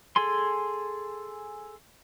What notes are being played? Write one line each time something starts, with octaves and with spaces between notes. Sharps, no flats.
G#4 A4 G#5 C6